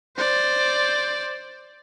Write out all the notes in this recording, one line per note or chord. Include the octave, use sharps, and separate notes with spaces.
C5 D5